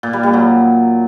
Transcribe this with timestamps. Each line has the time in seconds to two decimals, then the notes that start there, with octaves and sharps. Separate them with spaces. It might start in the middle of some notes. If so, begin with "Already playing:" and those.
0.03 A#2
0.13 G3
0.23 G3
0.33 F#3